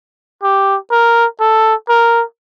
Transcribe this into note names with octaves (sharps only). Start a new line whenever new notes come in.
G4
A#4
A4
A#4